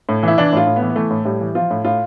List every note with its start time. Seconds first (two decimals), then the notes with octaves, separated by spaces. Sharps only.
0.09 A2
0.23 E3 E4
0.38 E3 D4
0.53 A2 F4
0.67 A2
0.76 B3
0.82 E3
0.90 B3
0.96 E3 A3
1.11 A2
1.25 A2 G3
1.41 E3
1.55 F3 F4
1.71 A2
1.85 A2 F4